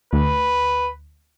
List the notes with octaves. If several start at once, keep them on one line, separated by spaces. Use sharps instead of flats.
D2 B4